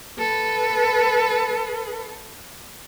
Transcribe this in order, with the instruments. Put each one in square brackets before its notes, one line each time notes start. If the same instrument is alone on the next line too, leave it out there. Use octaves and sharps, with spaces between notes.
[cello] A4 B4